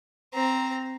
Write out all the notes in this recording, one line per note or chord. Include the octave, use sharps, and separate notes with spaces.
C4 A#5